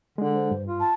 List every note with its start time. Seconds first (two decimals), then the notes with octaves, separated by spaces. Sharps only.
0.18 D3 G#3 D4
0.34 C5
0.51 G2
0.66 F4
0.80 A5